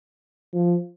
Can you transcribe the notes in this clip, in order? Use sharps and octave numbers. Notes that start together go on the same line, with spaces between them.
F3